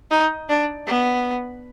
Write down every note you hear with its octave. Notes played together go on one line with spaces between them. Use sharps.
D#4
D4
B3